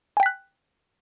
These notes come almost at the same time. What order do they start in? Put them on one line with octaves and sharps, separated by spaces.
G#5 G5 B6 F#6